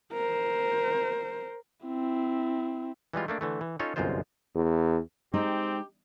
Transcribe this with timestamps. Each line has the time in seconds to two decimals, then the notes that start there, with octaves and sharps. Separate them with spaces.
0.13 A#4 C5
1.87 C4 E4
3.13 E3 G3 G#3 F4
3.28 A3 A#3 D4
3.41 D3 E3 A3
3.61 E3
3.79 C#4 D#4 F4 A4 C#5
3.96 G1 C2 F#2 G#3 F4 C5
4.55 E2
5.34 G#3 C4 D#4 G4